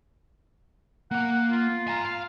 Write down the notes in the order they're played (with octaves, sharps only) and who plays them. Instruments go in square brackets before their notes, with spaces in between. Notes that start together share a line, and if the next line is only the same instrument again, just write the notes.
[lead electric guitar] A#3 F5 [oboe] F#5
[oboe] F4
[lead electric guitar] G#5 A#5
F5